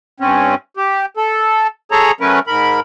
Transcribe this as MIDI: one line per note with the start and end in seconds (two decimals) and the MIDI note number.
0.20 0.55 43
0.20 0.55 60
0.20 0.55 61
0.77 1.06 67
1.17 1.67 69
1.92 2.12 68
1.92 2.12 69
1.92 2.12 73
1.92 2.12 82
2.20 2.39 54
2.20 2.39 57
2.20 2.39 61
2.20 2.39 70
2.20 2.39 71
2.47 2.80 44
2.47 2.80 70
2.47 2.80 83